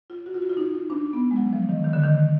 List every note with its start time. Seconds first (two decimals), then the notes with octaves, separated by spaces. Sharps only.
0.10 F4
0.26 F#4
0.34 F4
0.42 F#4
0.49 F4
0.57 D#4
0.74 D#4
0.90 D4
1.13 B3
1.31 G#3
1.36 F#3
1.53 F3
1.69 D#3
1.84 D#3
1.93 D3
2.03 D#3